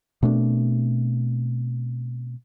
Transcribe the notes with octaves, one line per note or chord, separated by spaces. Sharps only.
B2 A3 C4 D4